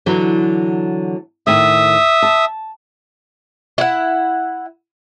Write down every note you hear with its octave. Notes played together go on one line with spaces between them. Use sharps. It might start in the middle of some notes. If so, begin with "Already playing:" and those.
D3 E3 F#3
A2 D#3 E5 G#5 D#6
A5
E4 F#5